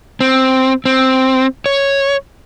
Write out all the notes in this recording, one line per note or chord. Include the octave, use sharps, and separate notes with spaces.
C4
C4
C#5